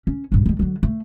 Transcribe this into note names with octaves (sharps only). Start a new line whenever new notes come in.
C#4
A#1 G2
D#3 G3
D3 F#3
A3